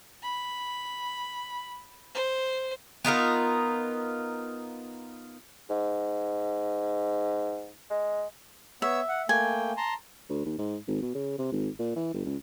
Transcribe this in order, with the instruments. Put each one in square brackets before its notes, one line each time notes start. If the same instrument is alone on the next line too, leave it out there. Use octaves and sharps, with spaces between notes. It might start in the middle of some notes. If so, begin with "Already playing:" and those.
[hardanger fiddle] B5
C5
[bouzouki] B3 D#4 F4 A#4
[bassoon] G#2
G#3
[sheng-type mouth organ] B3 C#5 E6 [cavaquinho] E5
[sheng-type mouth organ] F#5
[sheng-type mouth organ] A3 A#3 G5 [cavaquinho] G#5
[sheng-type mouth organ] A5 A#5 C6
[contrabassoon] D2
D#2
G#2
G#1
B2
C#3
C3
G#1
A#2
E3
G1
C#2